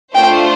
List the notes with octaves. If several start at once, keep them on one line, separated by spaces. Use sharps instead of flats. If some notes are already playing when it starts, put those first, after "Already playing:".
A3 D4 F4 C5 G5